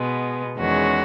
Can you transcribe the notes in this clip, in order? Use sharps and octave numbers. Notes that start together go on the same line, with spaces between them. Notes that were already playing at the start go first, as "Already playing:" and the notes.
Already playing: B2 G#3 B3
E2 D#3 G#3 C#4 F#4